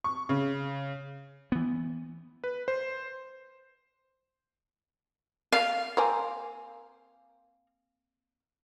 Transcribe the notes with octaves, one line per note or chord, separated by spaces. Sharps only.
C#6
C#3
E3 B3
B4
C5
F5
A#3 C4 F5 G#5 A#5